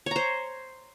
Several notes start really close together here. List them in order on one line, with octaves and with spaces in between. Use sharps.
C#5 A#5 C5